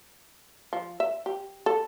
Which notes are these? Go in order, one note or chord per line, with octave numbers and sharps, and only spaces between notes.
F3
E5
G4
A4